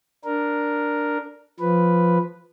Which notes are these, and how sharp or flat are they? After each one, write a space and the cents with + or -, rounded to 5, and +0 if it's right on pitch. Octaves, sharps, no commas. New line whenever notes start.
D4 +0 A#4 +0
F3 +0 B4 +0